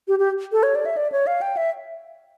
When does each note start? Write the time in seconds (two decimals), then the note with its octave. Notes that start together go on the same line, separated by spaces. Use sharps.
0.08 G4
0.19 G4
0.52 A4
0.63 C#5
0.75 D5
0.86 E5
0.97 D5
1.12 C#5
1.27 F5
1.41 G5
1.57 E5